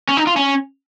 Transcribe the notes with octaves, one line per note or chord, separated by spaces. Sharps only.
C#4
D#4
F4
C#4